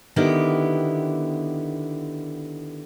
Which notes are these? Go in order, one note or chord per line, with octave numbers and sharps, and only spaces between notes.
D3 D#3 B3 E4 G4